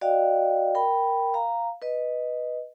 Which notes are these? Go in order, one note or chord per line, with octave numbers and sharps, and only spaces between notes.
F#4 D5 D#5 F5 G5
A#4 G5 B5
F5 A#5
B4 D#5